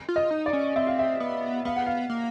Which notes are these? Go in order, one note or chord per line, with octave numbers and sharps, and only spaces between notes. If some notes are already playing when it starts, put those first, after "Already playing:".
F4
D#5
D#4
D5
C#4
C4 E5
F5
E5
B3
B3 F5
F#5
F5
A#3